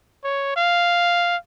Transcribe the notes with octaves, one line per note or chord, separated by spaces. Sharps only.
C#5
F5